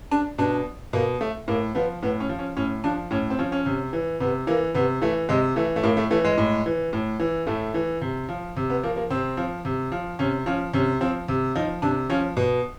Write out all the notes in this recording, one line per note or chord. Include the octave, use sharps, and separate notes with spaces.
D4
B2 D4
B2 A#3
A3
A2 A#3
F3 B3
A2 B3
C#4
F3
C#4
A2 C#4
F3 D4
A2 C#4
C4
F3 C#4
C#4
C3
E3
C3 B3
E3 A#3
C3 B3
E3 A3
C3 G#3
E3 A3
A3
A2 A#3
A3
E3 A3
G#3
A2
E3
A2
E3
A2 A3
E3
C3
F3
C3
B3
F3 A#3
A#3
C3 C4
F3
C3
F3
C3 C#4
F3 C#4
C3 C#4
F3 C4
C3
F3 D#4
C3 D4
F3 C#4
B2